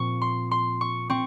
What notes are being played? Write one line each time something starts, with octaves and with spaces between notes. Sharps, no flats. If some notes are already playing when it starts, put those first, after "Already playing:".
Already playing: A#2 F3 C4 C#6
C6
C6
C#6
C4 C#6